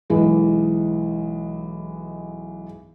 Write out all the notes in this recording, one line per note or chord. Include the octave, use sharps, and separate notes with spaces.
B1 E3 G#3